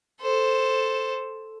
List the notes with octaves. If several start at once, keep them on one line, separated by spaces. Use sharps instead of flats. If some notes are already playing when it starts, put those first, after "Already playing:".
A4 C5